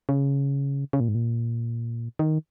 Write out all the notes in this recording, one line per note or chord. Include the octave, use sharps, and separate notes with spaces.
C#3
C#3
A#2
G#2
A#2
D#3